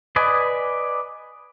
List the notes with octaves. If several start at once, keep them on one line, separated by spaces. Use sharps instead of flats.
B4 D5 D#5 G#5